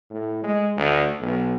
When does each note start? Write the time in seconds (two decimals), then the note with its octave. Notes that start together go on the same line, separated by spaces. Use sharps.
0.11 A2
0.43 G#3
0.77 D2
1.20 B1